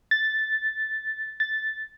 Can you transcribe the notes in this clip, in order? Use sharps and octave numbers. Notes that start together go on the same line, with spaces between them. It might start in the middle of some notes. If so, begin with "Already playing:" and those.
A6
A6